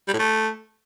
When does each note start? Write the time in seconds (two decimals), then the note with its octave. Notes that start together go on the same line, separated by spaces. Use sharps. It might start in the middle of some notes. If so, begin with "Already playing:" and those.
0.08 G3
0.13 A2
0.19 A3